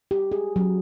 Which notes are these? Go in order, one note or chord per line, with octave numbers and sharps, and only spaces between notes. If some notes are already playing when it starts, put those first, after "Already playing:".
G4
G#4
F#3